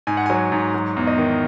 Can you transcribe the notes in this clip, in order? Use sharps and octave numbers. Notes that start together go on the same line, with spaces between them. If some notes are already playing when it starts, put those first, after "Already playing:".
G#2 G#5
F#5
F#3 G#5
G#2
F#3
E2
D#5
D#3